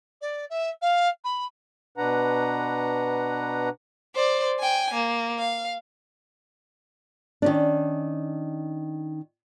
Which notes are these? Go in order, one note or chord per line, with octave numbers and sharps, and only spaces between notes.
D5
E5
F5
B5
B2 D4 B4 F#5 A#5
C5 D5
G5 G#5
A#3
F5
D#3 C#4 D4